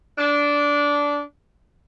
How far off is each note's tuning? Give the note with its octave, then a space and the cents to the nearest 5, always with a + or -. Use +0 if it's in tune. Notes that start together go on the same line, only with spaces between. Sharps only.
D4 -15